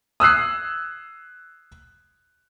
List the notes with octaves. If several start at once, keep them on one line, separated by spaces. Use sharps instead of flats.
D#6 E6 F#6 C7